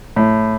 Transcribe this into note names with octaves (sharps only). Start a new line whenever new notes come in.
A2